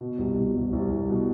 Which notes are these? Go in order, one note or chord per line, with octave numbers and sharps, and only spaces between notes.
B2
C2
B2
C2
C2
C2
B2